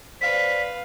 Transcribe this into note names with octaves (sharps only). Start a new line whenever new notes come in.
B4 C5 D5 F5 B6